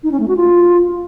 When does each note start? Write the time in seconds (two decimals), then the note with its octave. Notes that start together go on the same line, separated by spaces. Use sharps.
0.03 D#4
0.12 C#4
0.20 A3
0.28 F#4
0.36 F4